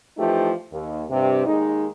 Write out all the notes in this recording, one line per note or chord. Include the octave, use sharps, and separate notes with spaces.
E3 F3 A3 D#4 G4
D#2
G2 C3
D#2 G#3 D#4